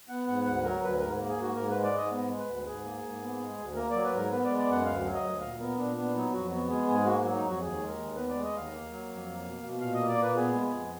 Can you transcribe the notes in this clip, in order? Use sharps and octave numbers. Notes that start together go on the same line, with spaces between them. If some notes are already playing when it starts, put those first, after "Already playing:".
B3 F#5
G#2 F#5
D2 F#5
F#3 A#4
D2 B4
G#2 A#4
A#3
G#4
G#2 F#4
G#2 A#4
G#3 B4
D5
G#2 D#5
B3
G#3
B4
D2
G#2 G#4
A#3
G#2
B3
G#3
D2
A#3 A#4
F#3 D5
B4
G#2 A#4
B3 B4
D5
G#3
D5
F#2 F#5
D2 F5
F#3
D#5
D2
A#2 F5
B3 A#4
A#2 D4
B3 D4
F#3 D#4
F2 F#4
B3 F#4
G#3 G#4
G#2 G#4
A#3 F#4
F#3
D#4
F2 F#4
D#2 G#4
G#3
A#4
D#2
B3 B4
G#3 D5
D#5
D#2 F5
A#3
F#3
F2
A#3
B2
B2
A#2 F5
A#3 D#5
D5
A#2
B4
B3 G#4
G#3
G#4
F2